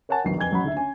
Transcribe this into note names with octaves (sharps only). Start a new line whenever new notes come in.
A#4 C#5 F#5 G#5 A5
A#1 D#2 F#3 B3 C7
F2 B4 G#5 G#6 G7
A1 F#3 F#5 B5
D2 D3 E5
C#4 G#5